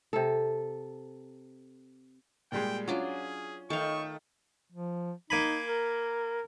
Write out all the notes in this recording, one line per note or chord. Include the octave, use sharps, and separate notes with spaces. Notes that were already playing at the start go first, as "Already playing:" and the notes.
C3 A4
A#2 G3 G#3 G5
F#3 C#4 D4 F4 G#4
D#3 A3 A4 F5 C#6
F3
A#3 D#4 G#5 B5
A#4